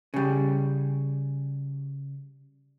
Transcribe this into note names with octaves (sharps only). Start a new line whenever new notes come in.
C#3 G3